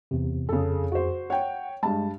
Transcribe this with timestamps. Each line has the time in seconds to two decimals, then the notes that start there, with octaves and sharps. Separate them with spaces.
0.11 E2 C3
0.49 F2 C#3 G#4 A4
0.92 F#4 C5
1.30 C#5 F#5 G5
1.83 G2 G#3 A5